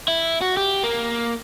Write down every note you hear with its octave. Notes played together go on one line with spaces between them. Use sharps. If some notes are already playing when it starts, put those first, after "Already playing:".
E4
F#4
G4
A#3